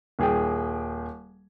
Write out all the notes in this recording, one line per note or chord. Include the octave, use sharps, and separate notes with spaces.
D#1 G#4 G5